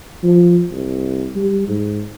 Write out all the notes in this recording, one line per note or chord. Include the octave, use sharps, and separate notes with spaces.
F3
C2
G3
G#2